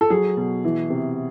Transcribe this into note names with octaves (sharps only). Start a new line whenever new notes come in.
A4
F#3 G#4
B2
E3
C3